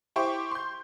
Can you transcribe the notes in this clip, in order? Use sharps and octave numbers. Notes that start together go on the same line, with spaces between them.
E4 G4 C5 G5 C#6 D6
C6 G6